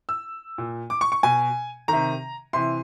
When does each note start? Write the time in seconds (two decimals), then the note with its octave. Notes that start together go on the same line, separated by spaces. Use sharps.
0.09 E6
0.58 A#2
0.90 D6
1.01 C#6
1.12 C#6
1.23 B2 G#5
1.88 C3 D#3 A#5
2.53 C3 E3 C6